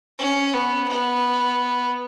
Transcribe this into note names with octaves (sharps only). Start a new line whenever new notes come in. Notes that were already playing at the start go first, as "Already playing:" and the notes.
C#4
B3
B3